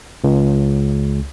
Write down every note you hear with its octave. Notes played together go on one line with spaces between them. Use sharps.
C#2